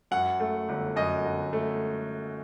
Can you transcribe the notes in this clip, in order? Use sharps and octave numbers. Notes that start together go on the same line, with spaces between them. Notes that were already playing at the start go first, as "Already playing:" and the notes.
F#2 F#5
A3
G1
F#2 D#5
G1
A3